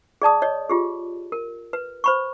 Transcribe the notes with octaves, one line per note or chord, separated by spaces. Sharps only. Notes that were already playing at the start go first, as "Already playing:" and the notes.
G#4 D5 A5 D#6
C#5 D#5
F4 G4 G#4
A#4
B4
C5 B5 C#6